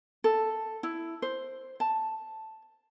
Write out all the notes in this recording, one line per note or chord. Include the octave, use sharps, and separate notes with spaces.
A4
E4
C5
A5